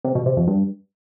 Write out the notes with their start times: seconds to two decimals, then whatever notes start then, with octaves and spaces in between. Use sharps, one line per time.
0.04 C3
0.15 B2
0.26 C3
0.37 F2
0.48 G2